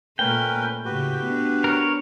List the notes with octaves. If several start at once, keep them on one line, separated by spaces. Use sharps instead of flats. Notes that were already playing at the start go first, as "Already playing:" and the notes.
A#2 A3 C#4 A#4 B4 G5
A2 C#3 F#4 G4 B4
B3 D4
A#4 C#5